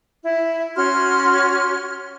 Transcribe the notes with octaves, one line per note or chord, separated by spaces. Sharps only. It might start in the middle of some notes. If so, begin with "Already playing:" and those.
E4
C#4 F#4 C6 F6